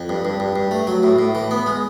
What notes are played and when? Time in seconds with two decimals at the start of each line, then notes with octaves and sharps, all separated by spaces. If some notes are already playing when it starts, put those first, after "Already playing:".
Already playing: F2
0.09 G2
0.25 G2
0.40 G2
0.56 G2
0.71 A3
0.87 F#3
1.03 A2
1.19 A2
1.35 E3
1.51 B3
1.66 G#3